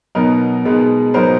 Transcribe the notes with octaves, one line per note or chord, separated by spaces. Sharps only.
B2 F#3 B3 D#4 A#4
B2 G#3 B3 D#4
B2 F#3 B3 D#4 A#4 C5